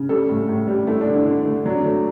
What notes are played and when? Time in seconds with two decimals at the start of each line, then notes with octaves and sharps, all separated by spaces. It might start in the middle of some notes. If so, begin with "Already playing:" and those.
Already playing: C#3
0.09 G3 A4
0.29 A2
0.49 A2
0.67 G3
0.87 A3 E4
1.01 D4
1.07 D3
1.14 E4
1.26 D3
1.45 A3
1.65 F#3 D4
1.85 A3